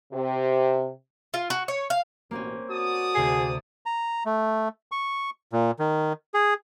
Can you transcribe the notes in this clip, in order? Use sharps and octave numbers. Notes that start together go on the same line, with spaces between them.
C3
F4
F#4
C#5
F5
A1 B2 A#3 C4 C#4
F#4 D5 A5 D#6
D2 C3 G#4 C7
A#5
A3
C#6
A#2
D#3
G#4